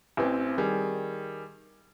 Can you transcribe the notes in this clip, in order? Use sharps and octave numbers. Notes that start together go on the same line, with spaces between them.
A1 E3 C4
D#3 G3 G#4